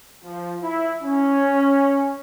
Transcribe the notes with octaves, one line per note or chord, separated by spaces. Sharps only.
F3
E4
C#4